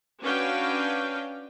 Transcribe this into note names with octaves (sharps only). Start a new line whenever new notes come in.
C#4 D4 F#4 B4 F5 G5